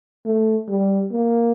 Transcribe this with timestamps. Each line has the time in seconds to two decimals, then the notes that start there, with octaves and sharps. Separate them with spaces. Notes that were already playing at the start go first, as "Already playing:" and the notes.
0.25 A3
0.69 G3
1.12 A#3